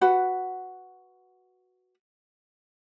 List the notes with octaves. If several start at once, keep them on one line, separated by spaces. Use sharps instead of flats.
F#4 B4 F#5